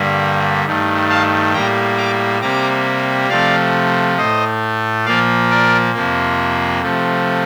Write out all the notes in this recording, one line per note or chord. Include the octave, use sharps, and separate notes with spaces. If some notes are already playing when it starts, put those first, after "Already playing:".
Already playing: G2 D3 G3 A#3
G2 D#3 A3
F5 A5
A2 G3 A#3 G5 A#5
A#5 D6
C3 G3 A#3 A#5 D6
C3 F3 A3 D5 F5
A2 A3 C5 D#5
A#2 F3 A#3 D5 F5
A#4 D5
F2 C3 F3 A#3
C3 F3 A3